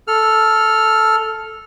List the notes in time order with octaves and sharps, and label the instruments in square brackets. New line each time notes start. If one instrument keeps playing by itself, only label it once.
[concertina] A4 F6